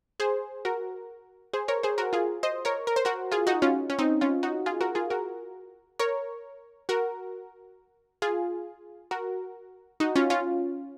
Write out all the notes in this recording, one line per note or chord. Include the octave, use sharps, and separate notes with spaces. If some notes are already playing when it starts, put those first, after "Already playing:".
G#4 C5
F#4 A#4
G#4 C5
A#4 C#5
G#4 C5
F#4 A#4
F4 G#4
C5 D#5
A#4 C#5
A#4
C5
F#4 A#4
F4 G#4
D#4 F#4
C#4 F4
C#4
C4 D#4
C#4 F4
D#4 F#4
F4 G#4
F#4 A#4
F4 G#4
F#4 A#4
A#4 C#5
F#4 A#4
F4 G#4
F#4 A#4
D#4 F#4
C#4 F4
C#4 F4